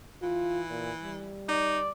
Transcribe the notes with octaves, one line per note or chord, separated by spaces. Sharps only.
E3 F4
A#2
G3
D#4 D5